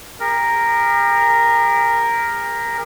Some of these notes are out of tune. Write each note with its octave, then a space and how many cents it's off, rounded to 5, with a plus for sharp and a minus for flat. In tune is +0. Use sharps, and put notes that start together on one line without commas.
G4 +45 A#4 +0